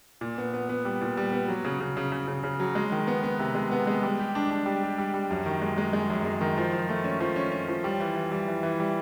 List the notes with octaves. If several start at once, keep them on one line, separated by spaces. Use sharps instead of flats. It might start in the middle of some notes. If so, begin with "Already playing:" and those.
A#2
B3
B3
B3
G3
A#2
G3
B3
F#3
C#3
C#3
C#3
C#3
C#3
C#3
F#3
G#3
D#3
B3
B3
C3
G#3
B3
G#3
G3
G4
D4
D4
G3
G4
G3
G3
F#2
D#3
G#3
G#3
G#3
F#2
G#3
D#3
F3
F3
A3
C#4
F3
C#4
C#4
F3
G3
E3
E3
G3
E3
E3
G3